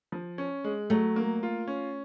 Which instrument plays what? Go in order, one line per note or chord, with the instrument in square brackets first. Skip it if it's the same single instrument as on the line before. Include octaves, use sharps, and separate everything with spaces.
[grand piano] F3
C#4
G#3
[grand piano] F#3 [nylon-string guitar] A3
[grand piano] A#3
F4
C#4